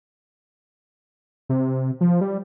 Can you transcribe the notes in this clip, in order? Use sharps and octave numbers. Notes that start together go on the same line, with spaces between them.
C3
F3
G3